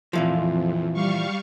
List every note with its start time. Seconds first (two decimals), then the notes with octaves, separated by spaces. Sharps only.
0.13 F2 A#2 E3 F3
0.93 G3 F5 C#6